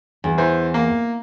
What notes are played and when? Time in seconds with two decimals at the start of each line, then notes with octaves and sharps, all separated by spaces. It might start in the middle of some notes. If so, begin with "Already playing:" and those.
0.24 E2
0.38 E3 C5
0.74 A#3